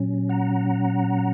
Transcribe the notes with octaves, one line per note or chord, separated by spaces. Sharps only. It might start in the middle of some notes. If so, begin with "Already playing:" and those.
Already playing: A#2 F#3 C#4
F#5 A#5